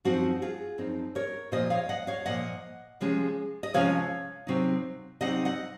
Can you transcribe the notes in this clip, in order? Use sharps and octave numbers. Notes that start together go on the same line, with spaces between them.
F#2 F3 C4 D#4 F#4
F4 G#4
F#2 F3 C4 D#4
A#4 C#5
A#2 F3 A#3 C5 D#5
C#5 F5
D#5 F#5
C#5 F5
A#2 F3 A#3 D#5 F#5
C3 F3 G#3 C#4
D#5
C3 F3 G#3 C#4 C#5 F5
C3 F#3 C4 D#4
C3 F#3 C4 D#4 D#5 F#5
D#5 F#5